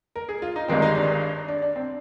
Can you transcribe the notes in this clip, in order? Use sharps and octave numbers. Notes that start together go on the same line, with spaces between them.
A#4
G#4
F4
D#4
G1 G2 D#3 G#3 C4
D#4
D4
D4
D4
C4